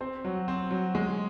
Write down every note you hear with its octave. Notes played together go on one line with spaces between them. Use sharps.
C4 C5
F#3
C4
F#3
G#3